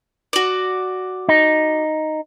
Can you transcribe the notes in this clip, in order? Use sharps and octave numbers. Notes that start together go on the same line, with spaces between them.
F#4 D5
D#4